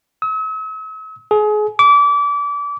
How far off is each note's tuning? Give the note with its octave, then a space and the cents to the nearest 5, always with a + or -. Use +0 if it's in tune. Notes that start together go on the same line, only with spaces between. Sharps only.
E6 -45
G#4 +30
D6 -30